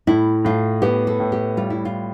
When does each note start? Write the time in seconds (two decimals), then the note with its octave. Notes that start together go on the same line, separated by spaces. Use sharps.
0.07 A2 E4
0.45 A2 F4
0.82 B3 G4
1.07 A4
1.20 A2
1.32 G4
1.57 G3 F4
1.70 E4
1.85 F4